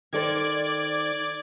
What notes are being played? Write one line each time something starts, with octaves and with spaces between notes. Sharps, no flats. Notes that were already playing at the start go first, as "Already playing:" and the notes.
D#3 A4 C5 D5 D6 G#6